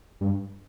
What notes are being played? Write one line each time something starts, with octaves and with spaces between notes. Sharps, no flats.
G2